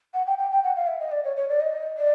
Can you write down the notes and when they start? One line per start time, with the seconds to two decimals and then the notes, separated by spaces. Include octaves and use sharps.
0.14 F#5
0.27 G5
0.38 G5
0.51 G5
0.64 F#5
0.76 F5
0.87 E5
1.00 D#5
1.12 D5
1.24 C#5
1.36 C#5
1.49 D5
1.61 D#5
1.98 D5